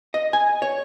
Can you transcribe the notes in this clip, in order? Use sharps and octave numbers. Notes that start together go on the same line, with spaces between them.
D#5
G#5
C#5